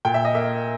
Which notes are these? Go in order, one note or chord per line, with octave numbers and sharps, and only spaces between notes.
A#2 G5
E5
D#5
A#3 E5